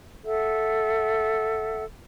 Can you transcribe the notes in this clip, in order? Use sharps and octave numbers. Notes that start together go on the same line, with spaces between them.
A4 E5 F#5